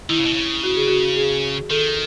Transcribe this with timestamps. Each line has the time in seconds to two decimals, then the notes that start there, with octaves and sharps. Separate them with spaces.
0.09 D#3 E4
0.18 C#3
0.25 B2
0.33 C#3
0.64 F#4
0.76 G#4
0.88 F#4
1.16 G#4
1.70 D#3 A4